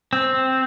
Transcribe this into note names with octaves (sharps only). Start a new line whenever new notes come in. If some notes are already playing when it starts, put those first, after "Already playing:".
C4